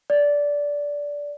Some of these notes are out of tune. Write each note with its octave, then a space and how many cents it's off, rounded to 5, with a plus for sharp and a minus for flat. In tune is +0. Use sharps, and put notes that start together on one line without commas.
D5 -15